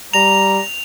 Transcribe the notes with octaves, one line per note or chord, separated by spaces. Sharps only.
G3 A#5 F7